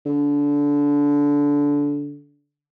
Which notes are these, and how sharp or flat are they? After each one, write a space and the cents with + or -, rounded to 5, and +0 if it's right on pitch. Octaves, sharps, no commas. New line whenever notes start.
D3 -20